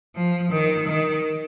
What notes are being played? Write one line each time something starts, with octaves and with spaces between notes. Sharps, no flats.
F3
D#3
D#3